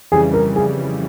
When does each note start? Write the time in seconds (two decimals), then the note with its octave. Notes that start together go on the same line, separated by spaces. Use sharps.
0.12 F2 C#3 E3 G3 G#4
0.34 A#4
0.56 G#4